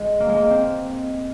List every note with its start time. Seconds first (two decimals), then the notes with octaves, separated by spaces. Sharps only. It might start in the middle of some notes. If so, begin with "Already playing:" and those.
Already playing: G#3
0.20 A#3
0.29 G#3
0.37 A#3
0.50 C4